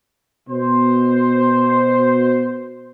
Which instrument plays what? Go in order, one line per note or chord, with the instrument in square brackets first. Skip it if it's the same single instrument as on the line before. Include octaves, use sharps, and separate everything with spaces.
[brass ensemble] B2 C5